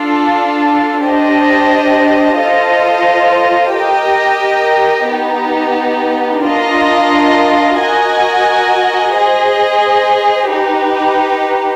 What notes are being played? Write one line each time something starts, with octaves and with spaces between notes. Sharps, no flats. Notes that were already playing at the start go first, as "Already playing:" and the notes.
Already playing: D4 F4 A4
D4 G4 C5 D#5
F4 A4 C5 D#5
G4 A#4 D#5 G5
B3 D#4 G4
D4 F4 A#4 D#5
F#4 A#4 D#5 G#5
G#4 C5 D#5
D#4 G4 B4